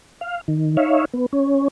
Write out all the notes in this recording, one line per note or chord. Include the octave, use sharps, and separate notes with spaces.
F5
D#3
D#4 C#5 E5 F5
B3
C#4